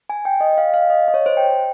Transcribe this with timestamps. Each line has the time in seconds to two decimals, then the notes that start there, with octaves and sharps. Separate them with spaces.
0.10 G#5
0.25 G5
0.41 D#5
0.53 D#5
0.58 F5
0.74 F5
0.90 D#5
1.08 D#5
1.14 C#5
1.26 C5
1.37 G5